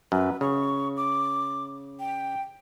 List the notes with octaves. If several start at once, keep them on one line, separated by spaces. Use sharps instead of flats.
F#2 B4
C#3 C#6
D6
G5